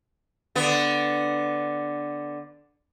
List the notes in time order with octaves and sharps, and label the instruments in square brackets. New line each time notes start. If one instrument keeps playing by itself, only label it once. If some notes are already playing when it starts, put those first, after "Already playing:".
[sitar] D3 B3